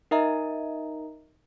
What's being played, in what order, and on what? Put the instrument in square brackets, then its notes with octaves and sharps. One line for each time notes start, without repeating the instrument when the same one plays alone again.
[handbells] D#4 A#4 D#5 E5 A#5